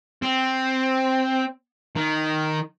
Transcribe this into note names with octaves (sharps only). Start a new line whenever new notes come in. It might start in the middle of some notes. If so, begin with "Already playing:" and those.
C4
D#3